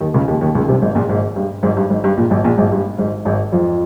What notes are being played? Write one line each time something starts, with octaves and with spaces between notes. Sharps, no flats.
D#2 D#3
C#2 C#3
D#2 D#3
D#2 D#3
C#2 C#3
C2 C3
G#1 G#2
A#1 A#2
G#1 G#2
G2
G#1 G#2
G2
G#1 G#2
G2
A#1 A#2
G#1 G#2
A#1 A#2
G#1 G#2
G2
G#1 G#2
G#1 G#2
F2 F3